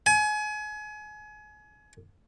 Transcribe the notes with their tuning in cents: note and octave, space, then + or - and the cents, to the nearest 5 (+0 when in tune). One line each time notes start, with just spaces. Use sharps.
G#5 +30